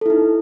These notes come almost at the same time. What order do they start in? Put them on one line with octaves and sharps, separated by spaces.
A4 E4 D#4